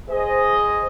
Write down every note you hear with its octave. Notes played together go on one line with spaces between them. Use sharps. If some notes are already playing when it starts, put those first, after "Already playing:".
G#4 C5 D#5